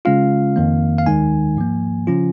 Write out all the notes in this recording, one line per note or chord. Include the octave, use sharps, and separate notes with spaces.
C#3 G#3 C#4 F4 F5
F2 D#3 A#3
F5
D#2 D#3 G#3 D#4 G#5
G#2 F3 A#3
C#3 F3 C#4 F4